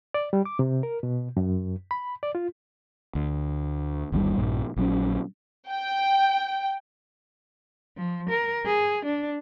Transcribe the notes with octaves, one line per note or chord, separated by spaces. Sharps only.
D5
G3
D6
C3
A#4
B2
F#2
B5
D5
F4
D2
G1 D#2 C3 G3
A#1 G2 A#2
A#1 F#3 C#4
G5
F3
A#4
G#4
D4